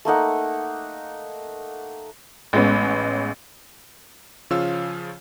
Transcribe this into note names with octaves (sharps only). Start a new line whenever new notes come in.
A3 A#3 D#4 F#5
A1 G#3 B3 C#4
C#3 F3 F4 C#5 F5 E6